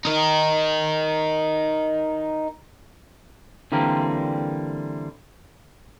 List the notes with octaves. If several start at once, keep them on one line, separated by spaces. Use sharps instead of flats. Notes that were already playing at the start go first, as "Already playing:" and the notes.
D#4 A#4
D3 E3 G3 A#3 C4 A#4